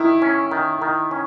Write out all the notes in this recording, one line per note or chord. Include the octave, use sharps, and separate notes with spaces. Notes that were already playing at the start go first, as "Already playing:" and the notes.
Already playing: D#3 E4
C#4
D#3
D#3
C#4